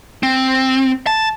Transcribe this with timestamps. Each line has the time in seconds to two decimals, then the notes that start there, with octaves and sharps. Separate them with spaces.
0.23 C4
1.07 A5